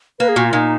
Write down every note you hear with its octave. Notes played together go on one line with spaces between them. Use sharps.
A#3 B4
G#4
A#2 F#4
F4
A#2 D#4